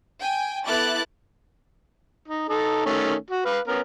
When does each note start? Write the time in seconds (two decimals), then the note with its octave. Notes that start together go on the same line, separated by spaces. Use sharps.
0.21 G5 G#5
0.67 B3 E4 A4 D6 F#6 A6
2.28 D#4
2.49 D#4 A4
2.86 D#3 A3 C#4
3.30 F#4
3.45 B4 F5
3.68 B3 C#4 A#4